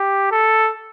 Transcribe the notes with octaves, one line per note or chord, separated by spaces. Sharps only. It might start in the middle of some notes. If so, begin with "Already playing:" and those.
Already playing: G4
A4